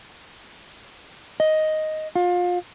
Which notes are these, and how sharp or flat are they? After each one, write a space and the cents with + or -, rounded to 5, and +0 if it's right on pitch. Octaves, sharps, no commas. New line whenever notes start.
D#5 +5
F4 +30